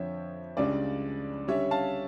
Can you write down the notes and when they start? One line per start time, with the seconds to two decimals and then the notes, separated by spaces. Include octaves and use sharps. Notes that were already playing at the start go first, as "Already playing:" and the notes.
Already playing: F2 D3 F3 C#5 E5
0.57 C#2 C#3 G3 D4 D5
1.48 D3 G3 C#4 C#5 E5
1.71 F5 A5